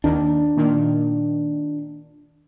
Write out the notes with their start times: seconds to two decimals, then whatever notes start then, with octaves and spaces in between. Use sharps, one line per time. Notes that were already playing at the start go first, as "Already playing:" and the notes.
0.04 D#2 D4
0.57 A#2 D#3